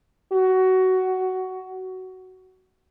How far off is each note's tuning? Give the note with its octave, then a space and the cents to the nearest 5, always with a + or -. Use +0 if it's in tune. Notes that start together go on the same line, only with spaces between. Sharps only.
F#4 +15